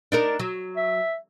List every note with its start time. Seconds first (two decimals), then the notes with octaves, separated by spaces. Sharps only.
0.12 D4 D#4 A#4
0.39 F#3
0.77 E5